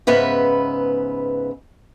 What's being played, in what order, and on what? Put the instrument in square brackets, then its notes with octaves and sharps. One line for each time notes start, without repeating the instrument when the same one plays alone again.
[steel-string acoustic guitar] G#2 C#3 B3 B4 E5